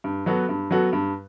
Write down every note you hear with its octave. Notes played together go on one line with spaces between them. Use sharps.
G2
F#3 B3 F#4 A4
G2
F#3 B3 F#4 A4
G2